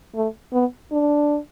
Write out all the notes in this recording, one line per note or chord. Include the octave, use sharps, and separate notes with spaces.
A3
B3
D4